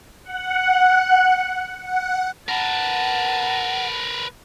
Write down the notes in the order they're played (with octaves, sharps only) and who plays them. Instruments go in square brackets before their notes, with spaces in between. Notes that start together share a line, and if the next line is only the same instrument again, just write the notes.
[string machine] F#5
F#5
[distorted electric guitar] A#4 B4 [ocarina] F#5 [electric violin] A5